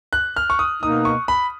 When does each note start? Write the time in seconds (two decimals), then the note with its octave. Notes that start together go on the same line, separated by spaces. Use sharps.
0.13 F#6
0.36 F6
0.50 C#6
0.59 D#6
0.82 B2 A#3 D#4 D#6
1.05 C#6
1.28 B5